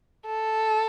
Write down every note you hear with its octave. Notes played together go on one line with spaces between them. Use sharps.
A4